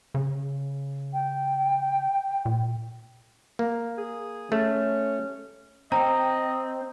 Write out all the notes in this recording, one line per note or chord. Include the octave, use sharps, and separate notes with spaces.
C#3
G5
A#2
A#3
G#4
A3 C#4
C4 D#5 G5 A#5